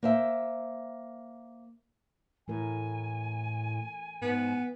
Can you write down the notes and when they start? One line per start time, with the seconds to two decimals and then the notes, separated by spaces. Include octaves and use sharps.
0.03 A#3 C5 E5
2.48 A2 E3 A3 A#4 G#5
4.22 G#2 B3